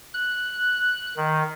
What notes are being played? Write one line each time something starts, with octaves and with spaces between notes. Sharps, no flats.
F#6
D#3